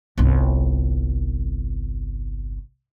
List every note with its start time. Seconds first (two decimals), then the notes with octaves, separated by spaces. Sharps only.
0.18 G1 C2